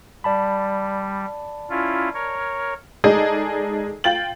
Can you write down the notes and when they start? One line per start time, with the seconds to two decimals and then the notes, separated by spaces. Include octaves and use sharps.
0.24 G3 D5 A5 B5
1.70 C#4 E4 F4
2.14 A#4 C#5
3.04 G#3 D#4 G#4 A4 D5 D#5
4.04 F4 G5 A6 F#7